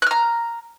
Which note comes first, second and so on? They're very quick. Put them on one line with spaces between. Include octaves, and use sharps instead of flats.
F#6 F6 A#5